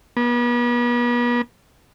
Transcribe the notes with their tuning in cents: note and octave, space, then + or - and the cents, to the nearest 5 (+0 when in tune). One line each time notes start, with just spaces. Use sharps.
B3 -40